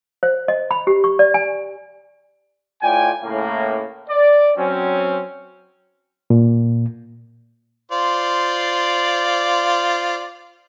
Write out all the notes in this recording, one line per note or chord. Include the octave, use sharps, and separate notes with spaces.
C5
D#5
B5
G4
C#6
D5
G#5
A2 F4 D5 G5 G#5
A2 C#3 A#3
D5
F#3 C4 C#4
A#2
F4 C5 D5